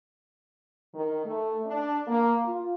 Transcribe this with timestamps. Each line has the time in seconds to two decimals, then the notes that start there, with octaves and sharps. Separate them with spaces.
0.94 D#3
1.25 A3
1.66 D4
2.07 A#3
2.44 F4